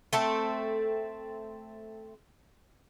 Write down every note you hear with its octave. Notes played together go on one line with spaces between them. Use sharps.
A3 C4 A4